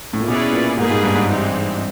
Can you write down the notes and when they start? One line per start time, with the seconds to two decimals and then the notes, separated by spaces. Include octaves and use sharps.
0.13 A2
0.20 A#2
0.27 B2 C#4 E4 G#4 B4 D5
0.53 A#2
0.77 G#2 G3 A#3 D#4 G#4 B4
0.90 G#2
1.03 G2
1.15 G#2
1.28 G2 E3 G#3 C4 D#4 G4